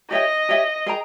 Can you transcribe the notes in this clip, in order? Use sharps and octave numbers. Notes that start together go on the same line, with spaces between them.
G4 C#5 D#5 E5 G5
G4 C#5 E5 G5
G#4 D#5 G5 A#5